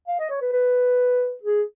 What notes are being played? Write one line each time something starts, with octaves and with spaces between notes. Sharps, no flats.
F5
D#5
C#5
B4
B4
G#4